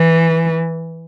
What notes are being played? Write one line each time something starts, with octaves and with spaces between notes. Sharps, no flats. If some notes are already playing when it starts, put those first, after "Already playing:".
Already playing: E3